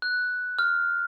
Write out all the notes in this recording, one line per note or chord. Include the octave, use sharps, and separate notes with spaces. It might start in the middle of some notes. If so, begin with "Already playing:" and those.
F#6
F6